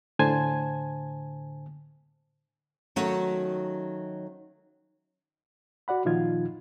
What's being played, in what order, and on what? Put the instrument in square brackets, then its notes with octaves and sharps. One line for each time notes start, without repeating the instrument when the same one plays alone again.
[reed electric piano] A2 D3 C5 G#5 A5 G#6
[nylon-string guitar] D#3 F#3 A3 C#4 F#4
[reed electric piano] F#4 D5 F#5 B5
A#2 D#3 F3 D#4 F4 G#6